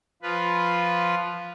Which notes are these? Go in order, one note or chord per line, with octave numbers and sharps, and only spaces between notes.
F3 F4 B4